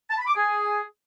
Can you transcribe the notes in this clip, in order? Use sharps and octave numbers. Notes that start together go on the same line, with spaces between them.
A5
B5
D6
G#4